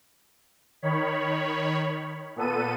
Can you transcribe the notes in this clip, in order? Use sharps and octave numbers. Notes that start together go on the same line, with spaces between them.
D#3 C#5 B5
A#2 B3 A4 D#7